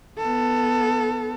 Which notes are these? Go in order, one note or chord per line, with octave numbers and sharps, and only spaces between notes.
B3 A4